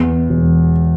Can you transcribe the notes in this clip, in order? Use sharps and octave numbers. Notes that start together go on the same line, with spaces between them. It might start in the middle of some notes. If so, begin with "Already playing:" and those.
Already playing: E2
E1